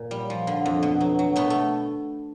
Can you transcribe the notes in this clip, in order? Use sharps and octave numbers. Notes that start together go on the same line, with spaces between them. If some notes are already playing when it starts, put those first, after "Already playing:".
Already playing: A#2
G3
F3
D3
F2
B2
F#3
F#3
B2 A3 B3
A3